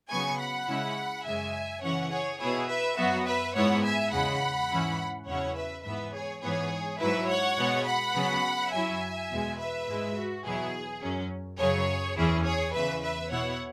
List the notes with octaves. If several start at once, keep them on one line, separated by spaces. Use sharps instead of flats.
C#3 F#3 B3 G#5 C#6
F#5 B5
C#3 G#3 C#4 E4
F#2 C#3 G#3 E5 G#5
C#3 E3 C#4 C#5 F#5
G#4 C#5
B2 B3 E4 G#4 C#5
B4 E5
F#2 F#3 B3 F#4
B4 E5
G#2 G#3 B3 E4 C#5 F#5
E5 G#5
E2 C#3 G#3 F#5 B5
G#2 E3 C#4 E4
E2 C#3 F#3 C#4 E4 C#5 F#5
B4 E5
G#2 E3 B3 B4 E5
G#4 C#5
G#2 E3 B3 G#4 C#5
G#2 F#3 E4 B4 E5
C#5 F#5
B2 G#3 B3
F#5 B5
C#3 F#3 B3
F#2 F#3 E4 E5 G#5
E2 B2 G#3
B4 E5
G#2 G#3 E4
F#4
E2 B2 F#3 B3 E4 G#4
F#2 F#3 C#4
F#2 C#3 F#3 G#4 C#5
E2 E3 C#4 E4 G#4
G#4 C#5
E2 C#3 E3 B4 E5
B4 E5
B2 B3 E4 C#5 F#5